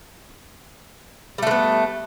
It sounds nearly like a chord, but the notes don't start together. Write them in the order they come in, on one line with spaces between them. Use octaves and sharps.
G3 A3 D3 B3